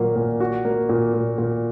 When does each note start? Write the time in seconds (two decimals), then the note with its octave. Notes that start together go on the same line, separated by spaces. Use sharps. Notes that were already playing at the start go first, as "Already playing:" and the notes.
Already playing: A#2 F#3 A#3
0.16 A#2
0.40 F#4
0.65 A#3
0.89 A#2
1.13 A#2
1.38 A#2